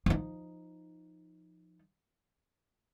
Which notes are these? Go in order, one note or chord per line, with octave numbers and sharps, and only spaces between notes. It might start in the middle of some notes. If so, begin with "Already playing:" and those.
F3 D#4